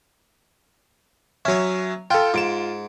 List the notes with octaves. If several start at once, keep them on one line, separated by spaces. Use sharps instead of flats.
F#3 C#4 C#5 E5
F4 A4 G5
G#2 F4 D7 E7